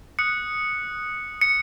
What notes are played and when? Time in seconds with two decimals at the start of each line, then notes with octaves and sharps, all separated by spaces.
0.19 D#6 F#6 C#7
1.41 C#7